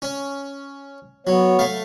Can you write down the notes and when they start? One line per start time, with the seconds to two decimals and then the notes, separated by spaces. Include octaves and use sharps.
0.02 C#4
1.27 F#3 B3 C#5
1.59 A3 F5